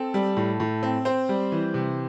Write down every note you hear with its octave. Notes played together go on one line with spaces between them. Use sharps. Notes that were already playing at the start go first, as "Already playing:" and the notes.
Already playing: C4 A4
G3
A2
A2
C4
C4 C5
G3
E3
C3